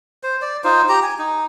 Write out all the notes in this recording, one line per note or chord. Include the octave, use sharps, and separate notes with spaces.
C5
D5
D#4 F4 C5
G4 A#5
G#5
D#4